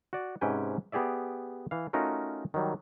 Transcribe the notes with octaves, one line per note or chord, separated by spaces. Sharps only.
F#4 D5
G#2 C3 C#4 B4 G5 G#5
B3 G4 G#4 D5 E5
E3 F5
A3 C#4 D#4 F4 F#4 A#4
D#3 F#3 G3